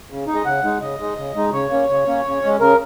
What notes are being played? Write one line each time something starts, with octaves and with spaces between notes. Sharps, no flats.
C#3
D#4
G#3 D#5
C#3 F#5
G#3 D#4
C#3 D#5
G#3 D#4
C#3
G#3 D#4
C#3 C#5
A#3 C#4
C#3
A#3 C#4
C#3
G#3 C#4
C#3 A#4